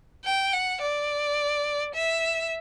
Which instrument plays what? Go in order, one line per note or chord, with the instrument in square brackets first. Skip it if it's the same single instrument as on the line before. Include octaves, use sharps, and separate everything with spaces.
[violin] G5
F#5
D5
E5